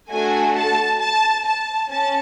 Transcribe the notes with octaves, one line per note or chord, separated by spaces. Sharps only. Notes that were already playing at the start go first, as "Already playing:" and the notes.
A3 D4 F#4 A4 G#5
A5
A5
A5
C#4 A5